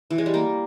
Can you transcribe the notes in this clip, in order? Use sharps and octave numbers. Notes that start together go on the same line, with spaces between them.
E3
G#3
G3
A#3